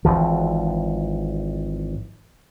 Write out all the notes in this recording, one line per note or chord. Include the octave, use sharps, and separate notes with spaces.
G#1 D2 E3 F3